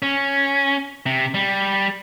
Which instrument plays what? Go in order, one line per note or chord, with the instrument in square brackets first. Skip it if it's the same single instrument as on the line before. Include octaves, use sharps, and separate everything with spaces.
[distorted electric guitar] C#4
C3
G3